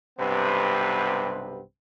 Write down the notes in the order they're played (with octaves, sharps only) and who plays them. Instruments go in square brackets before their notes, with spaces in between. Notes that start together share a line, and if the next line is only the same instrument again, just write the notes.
[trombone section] B1 G2 C3 B3 C4 B4